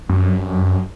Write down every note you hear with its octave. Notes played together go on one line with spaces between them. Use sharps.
F#2